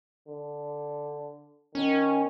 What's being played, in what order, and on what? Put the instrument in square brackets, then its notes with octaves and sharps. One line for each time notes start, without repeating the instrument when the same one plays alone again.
[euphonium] D3
[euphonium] D#3 [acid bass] C#4